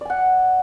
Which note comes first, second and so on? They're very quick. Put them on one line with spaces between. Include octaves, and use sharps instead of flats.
D5 G#5 F#5